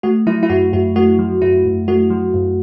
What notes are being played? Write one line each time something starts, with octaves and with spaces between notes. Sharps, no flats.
A3 F#4
F#3 E4
E4
F#2 F#4
F#2 F#4
A3 F#4
F#3
F#2 E4
F#2
A3 F#4
F#3
F#2